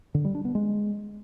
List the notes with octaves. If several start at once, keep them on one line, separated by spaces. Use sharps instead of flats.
D3
G3
D4
B3
G#3